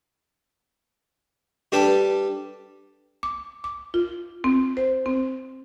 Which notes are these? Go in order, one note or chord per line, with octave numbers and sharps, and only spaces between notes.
G3 D4 G4 A4 B4
D6
D6
F4
C4
C5
C4